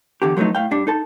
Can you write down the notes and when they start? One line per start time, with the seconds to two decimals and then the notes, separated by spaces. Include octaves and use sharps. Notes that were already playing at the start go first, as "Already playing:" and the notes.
0.22 E2 D3 G4
0.37 F3 F#3 A3 B3 D#4
0.55 A2 F5 G5
0.71 G2 G3 D4
0.87 D#4 A4 A5